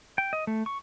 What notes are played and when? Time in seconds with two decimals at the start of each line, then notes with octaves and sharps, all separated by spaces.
0.18 G5
0.33 D#5
0.47 A3
0.66 C#6